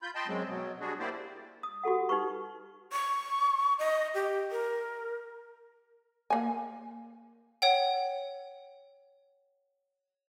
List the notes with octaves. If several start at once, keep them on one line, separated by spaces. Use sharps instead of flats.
F4 B5 G6
D#5 G5 A5 B5 C6
F#2 F#3 G#3 C4
B2 F#3
G3 D4 F#4 G#4
A#3 E4 G4 C5 D5
D#6
F#4 G4 A4 F#5
D#4 G4 B4 C#6
C#6
D#5
G4
A#4
A#3 G#5
C#5 F#5 G5